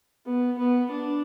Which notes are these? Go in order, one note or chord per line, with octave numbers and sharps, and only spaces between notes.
B3
B3
D4